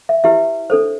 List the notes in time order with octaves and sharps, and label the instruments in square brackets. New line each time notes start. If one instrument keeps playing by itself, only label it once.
[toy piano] E5
E4 G4 B4 E5
D4 A4 C5